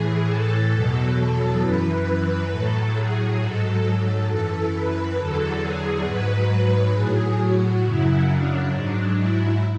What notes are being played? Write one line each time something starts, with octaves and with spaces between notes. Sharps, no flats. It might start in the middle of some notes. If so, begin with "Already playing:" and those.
Already playing: A2 E3 G#4
A4
E2 B2 F#3
A4
F#2 E3 B4
A2 F#3 A4
G#4
G#2 F#3 A4
F#2 E3 A4
B4
E2 D3 F#3 A4
G#4
G#2 F#3 B4
A2 F#3 G#4
F#4
F#2 C#3 F#3 E4
D4
G#2 F#3
E4